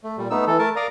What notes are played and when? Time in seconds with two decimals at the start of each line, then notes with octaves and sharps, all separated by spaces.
0.04 A3
0.18 A#2 G3
0.30 A3 B3 D#4 E6
0.47 E3 A4
0.59 A3 A#4 A5
0.76 A#4 D5 F5 A#5 D#6